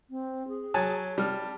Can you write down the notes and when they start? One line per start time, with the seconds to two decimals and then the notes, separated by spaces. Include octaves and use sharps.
0.10 C4
0.48 G#4
0.74 F#3 G#5 A5
1.18 G3 A5 F6